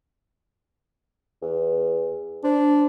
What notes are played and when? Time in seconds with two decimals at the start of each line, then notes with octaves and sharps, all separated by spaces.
1.42 E2
2.44 D4 C5